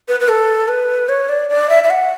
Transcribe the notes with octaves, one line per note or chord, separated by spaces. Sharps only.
B4
B4
A4
B4
C#5
D5
D5
E5
E5
F#5